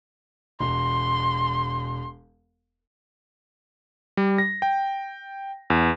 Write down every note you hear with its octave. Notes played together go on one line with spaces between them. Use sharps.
E1 C6
G3
A#6
G5
E2